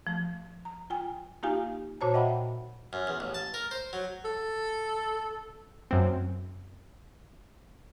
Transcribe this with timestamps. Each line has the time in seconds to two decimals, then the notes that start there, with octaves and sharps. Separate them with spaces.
0.07 F3 A3
0.65 A#5
0.90 F4 G5 G#5
1.43 A#3 D#4 F4 G4 F5 G#5
2.01 A#2 F#4 C5 C#5 A5 A#5
2.14 D#5 E5 F#5 G5 B5
2.93 F#2
3.07 E2
3.20 A1
3.34 A5
3.54 A#4
3.71 C5
3.93 F#3
4.25 A4
5.91 F#2 C4